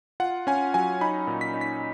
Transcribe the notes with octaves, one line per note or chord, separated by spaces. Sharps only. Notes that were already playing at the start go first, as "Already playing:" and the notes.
F4 F#5
C#4 G#5
F#3 G#5
D#4 B5
A#2
B6
D#4
B6